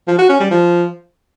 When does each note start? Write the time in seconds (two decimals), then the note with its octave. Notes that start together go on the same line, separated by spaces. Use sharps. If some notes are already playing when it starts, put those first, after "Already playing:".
0.07 F3
0.18 F#4
0.29 C#4
0.40 G3
0.51 F3